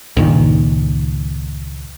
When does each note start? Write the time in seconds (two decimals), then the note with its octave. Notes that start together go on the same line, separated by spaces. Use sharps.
0.17 C#2 G2 A#2 D#3